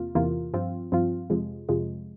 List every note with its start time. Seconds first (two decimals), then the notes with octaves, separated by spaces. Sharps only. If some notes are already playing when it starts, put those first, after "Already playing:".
Already playing: E2 C3 A#3 F4
0.15 E2 C3 E3 A#3 F4
0.53 G2 F3 C4 F4
0.92 G2 F3 C4 F4
1.30 F2 C3 F3 G#3
1.69 F2 C3 F3 G#3